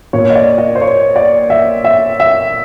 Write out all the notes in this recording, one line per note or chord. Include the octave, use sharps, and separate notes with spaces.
A#2 C#5
D#5
D5
D#5
C5
C#5
D5
E5
E5
E5